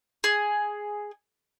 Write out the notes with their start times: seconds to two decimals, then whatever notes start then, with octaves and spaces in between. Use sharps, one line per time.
0.24 G#4